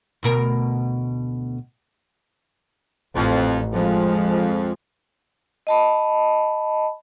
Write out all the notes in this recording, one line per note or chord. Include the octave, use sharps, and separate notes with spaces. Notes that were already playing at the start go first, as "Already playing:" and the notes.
D2 B2 A#4
A1 F2
F2 F3 G#3
D#5 A5 B5